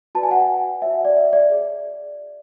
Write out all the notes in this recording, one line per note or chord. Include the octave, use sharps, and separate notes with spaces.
F#4 B4 D5 A5
G#5
F#5
G#5
F#4 C#5 E5
F#5
D5
E5
D5
G#4 D5